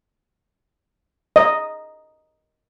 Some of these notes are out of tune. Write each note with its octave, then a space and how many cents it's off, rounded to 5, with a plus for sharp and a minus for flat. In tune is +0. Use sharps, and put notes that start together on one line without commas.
D#5 +0